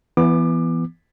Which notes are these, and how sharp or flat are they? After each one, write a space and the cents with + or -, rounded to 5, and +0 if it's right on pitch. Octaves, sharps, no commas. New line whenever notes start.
E3 +20 B3 +0 D6 +25